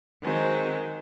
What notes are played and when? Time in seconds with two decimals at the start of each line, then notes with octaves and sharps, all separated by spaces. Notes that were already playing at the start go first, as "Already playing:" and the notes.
0.23 D#3 F#3 G#3 C4